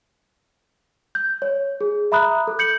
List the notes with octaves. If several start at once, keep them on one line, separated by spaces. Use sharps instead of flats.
G6
C#5
G#4
E5 A#5 B5 D#6 F#6
A4
G6 C#7 F#7